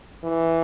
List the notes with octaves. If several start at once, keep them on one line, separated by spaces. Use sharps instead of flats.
E3